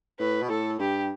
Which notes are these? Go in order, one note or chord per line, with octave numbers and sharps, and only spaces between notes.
A2 B4
B2
A2 A4
G2 G4